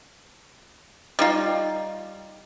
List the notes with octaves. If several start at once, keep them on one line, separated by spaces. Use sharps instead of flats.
G3 D#4 F4